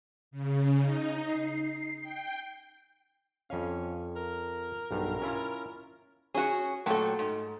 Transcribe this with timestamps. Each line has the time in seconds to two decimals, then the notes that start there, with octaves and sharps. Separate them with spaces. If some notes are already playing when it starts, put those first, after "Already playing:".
0.31 C#3
0.80 D#4
1.25 C7
2.02 G5
3.50 F2 C#4 F5
4.16 A#4
4.91 B1 G2
5.22 C#4 E4 F4
6.34 C#4 F#4 G#4 C#5
6.86 A#2 F#3 A3 A4 G5
7.19 G#2